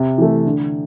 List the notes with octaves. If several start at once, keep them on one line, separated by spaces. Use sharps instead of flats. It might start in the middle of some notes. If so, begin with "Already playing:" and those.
Already playing: C3
E3 A3
D3